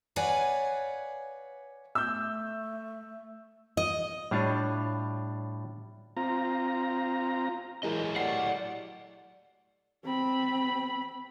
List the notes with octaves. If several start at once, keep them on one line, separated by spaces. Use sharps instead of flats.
B4 C#5 D5 F5 F#5 G#5
A3 E6 G6
D#5
A2 G3 D4 F4 C#5
C4 F4 A#5
E3 F#3 G#3 E4 A#4 D#5
A3 G4 D5 F#5 C7
C4 B5